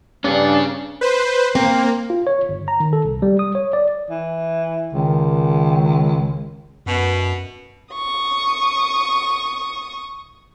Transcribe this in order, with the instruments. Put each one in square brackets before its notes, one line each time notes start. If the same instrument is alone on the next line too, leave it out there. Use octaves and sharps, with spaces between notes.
[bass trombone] G2 [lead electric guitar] C#4 G#4 [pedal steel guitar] D4 D5
[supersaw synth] B4 C5
[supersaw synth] A#3 [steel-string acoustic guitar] C4
[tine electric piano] F4
C#5
G1
A#5
D#3
A4
C2
G3
D#6
C#5
D5
[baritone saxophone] E3
[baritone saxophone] C#2 [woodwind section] D#3
[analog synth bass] F#2 [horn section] B2
[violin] C#6 D#6